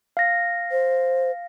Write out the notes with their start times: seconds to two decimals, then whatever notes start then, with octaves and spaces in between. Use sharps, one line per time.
0.17 F5 A#6
0.71 C5